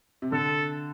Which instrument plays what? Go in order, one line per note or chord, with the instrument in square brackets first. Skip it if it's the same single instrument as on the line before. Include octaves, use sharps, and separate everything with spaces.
[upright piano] C3
[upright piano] D3 [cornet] A4